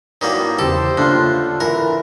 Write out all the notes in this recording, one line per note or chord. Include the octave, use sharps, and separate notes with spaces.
G2 D#3 G3 A#3 E4 F#4 C#5
E2 C#3 E3 G4 A4 C5
A2 C#3 A#3 D4 F4 F#6
D3
E3 A4 A#4 E5